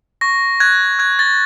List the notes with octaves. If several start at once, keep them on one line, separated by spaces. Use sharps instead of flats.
C#6 A#6
F#6 G#6
F#6 G#6
A6